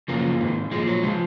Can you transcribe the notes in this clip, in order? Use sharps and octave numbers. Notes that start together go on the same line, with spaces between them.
F#2 C#3 F3 A#3
G#2 D#3
A#2 F3 G#3
F#3
C#3 F3 G#3